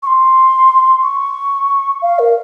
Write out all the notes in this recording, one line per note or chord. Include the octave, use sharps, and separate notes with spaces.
C#6
C6
C#6
F5
A#4